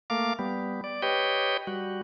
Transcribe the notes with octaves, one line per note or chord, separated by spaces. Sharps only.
A3 A#3 F5 D6
G3 B3
D5
G4 B4 C#5 D#5 G5
G3 F#4